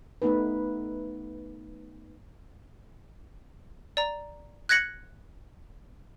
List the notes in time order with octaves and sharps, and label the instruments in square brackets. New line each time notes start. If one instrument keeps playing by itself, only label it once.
[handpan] A3 B3 D#4 B4
[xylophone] D5 A#5
F#6 G#6 A#6 C#7 F#7